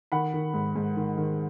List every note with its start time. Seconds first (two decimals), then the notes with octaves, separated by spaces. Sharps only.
0.12 D#3 F#5 B5
0.34 D#3
0.54 G#2
0.76 G#2
0.97 D#3
1.17 D#3